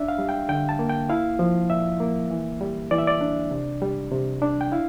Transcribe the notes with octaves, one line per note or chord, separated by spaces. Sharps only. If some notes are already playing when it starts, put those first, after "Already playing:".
Already playing: D4 E5
F5
G3
G5
D3 G5
A5
A#3
G5
E4 F5
F3
A#2 E5
A#3
E3
G3
E3 D5
E5
D5
D4
C3
G3
C3
D4
G5
E4 F5